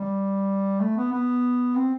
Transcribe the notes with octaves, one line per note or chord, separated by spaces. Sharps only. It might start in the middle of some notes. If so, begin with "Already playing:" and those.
Already playing: G3
A3
B3
B3
C4